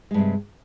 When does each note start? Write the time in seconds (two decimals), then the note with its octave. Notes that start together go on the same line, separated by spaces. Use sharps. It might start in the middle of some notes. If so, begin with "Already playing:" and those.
0.11 G#3
0.14 G2
0.18 C3